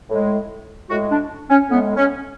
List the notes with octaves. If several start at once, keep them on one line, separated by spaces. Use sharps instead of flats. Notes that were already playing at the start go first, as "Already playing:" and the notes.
A2 G#3
A2 G#3 F#4
D4
C#4
A2 G#3 B3
C#4